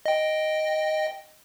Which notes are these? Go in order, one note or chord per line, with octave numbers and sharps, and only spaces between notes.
D#5 G5